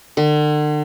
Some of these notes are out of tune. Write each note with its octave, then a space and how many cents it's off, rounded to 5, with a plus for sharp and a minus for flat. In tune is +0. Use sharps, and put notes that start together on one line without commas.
D3 +40